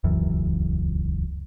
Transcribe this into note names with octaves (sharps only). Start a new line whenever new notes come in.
D#1 C#2 F#2 E3